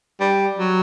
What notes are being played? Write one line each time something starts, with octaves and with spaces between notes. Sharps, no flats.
G3
F#3